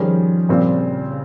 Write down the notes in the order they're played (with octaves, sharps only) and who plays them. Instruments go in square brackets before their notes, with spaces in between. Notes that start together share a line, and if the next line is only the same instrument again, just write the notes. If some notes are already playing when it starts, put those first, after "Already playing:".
Already playing: [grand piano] D#3 G3 C#4 G#4 C5 [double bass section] F3
[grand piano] A#2 G3 C4 F4 [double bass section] C#3